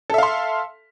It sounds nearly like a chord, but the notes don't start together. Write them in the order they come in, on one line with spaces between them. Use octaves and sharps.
A4 E5 F5 C6